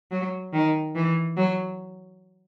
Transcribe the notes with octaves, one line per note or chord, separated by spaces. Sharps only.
F#3
D#3
E3
F#3